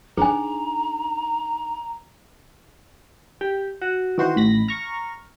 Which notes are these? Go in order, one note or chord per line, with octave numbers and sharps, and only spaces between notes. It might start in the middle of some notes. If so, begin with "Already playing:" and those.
D4 D#4 G#4 G#5 A#5
G4
F#4
D#3 E3 F#4 C5
A1 B5 A#6
A#5 C#6 F6